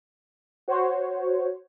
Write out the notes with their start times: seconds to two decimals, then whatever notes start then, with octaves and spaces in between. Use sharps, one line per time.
0.68 F#4 C5 C#5